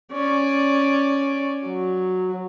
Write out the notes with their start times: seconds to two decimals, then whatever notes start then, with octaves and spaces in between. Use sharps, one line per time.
0.12 C#4 D5
1.65 F#3